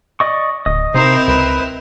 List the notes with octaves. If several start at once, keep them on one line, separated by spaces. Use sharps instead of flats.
D5 D#5 C#6
D1 D#5
C3 C4 D#4 E4 A#4 C5
C#2 B4